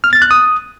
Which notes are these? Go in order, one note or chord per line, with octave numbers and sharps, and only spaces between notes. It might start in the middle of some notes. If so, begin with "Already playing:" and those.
F6
A6
F#6
D#6